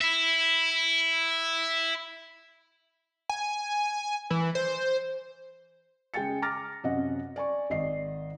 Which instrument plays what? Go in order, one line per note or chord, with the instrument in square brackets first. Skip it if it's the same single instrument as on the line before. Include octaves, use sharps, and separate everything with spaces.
[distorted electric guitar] E4 E5
[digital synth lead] G#5
E3
C5
[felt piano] C#3 G#3 G5 G#5 A6 C#7
A#5 D6 F6 A6 A#6
F#2 C3 D#5 F#5
D5 G#5 C#6
G#1 D#3 D5 D#5 C7